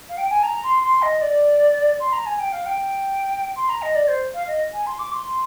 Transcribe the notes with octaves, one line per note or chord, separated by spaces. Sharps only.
F5
G5
G#5
A#5
C6
C6
D#5
D5
C6
A#5
G#5
G5
F5
G5
C6
A#5
D#5
D5
C5
F5
D#5
G#5
C6
D6
C6